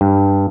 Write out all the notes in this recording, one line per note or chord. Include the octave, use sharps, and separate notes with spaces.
G2